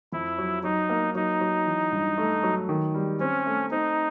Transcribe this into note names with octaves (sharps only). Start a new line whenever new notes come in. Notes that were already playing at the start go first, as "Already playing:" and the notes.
F2 E4
F#3
F#3 D#4
A#3
F#3 D#4
F#3
E3
G2
A3
F#3
D#3
G3
C4 C#4
A3
C4 D#4